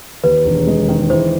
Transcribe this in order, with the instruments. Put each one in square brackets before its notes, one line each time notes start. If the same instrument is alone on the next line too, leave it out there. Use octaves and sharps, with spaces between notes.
[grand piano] D#2 [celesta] B4
[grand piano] E1
G#3
D#3
[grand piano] E3 [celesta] C5